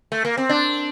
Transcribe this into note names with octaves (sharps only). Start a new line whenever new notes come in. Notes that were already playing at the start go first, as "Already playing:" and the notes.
A3
A#3
C4
D4